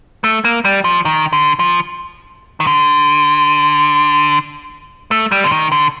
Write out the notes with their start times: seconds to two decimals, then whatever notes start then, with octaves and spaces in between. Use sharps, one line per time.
0.24 A3
0.45 A#3
0.65 G3
0.84 F3
1.05 D#3
1.33 D3
1.59 F3
2.60 D#3
2.67 D3
5.11 A3
5.32 G3
5.44 D3
5.52 D#3
5.72 D3